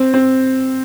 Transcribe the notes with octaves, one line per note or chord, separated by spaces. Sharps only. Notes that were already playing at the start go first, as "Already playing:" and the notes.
Already playing: C4
C4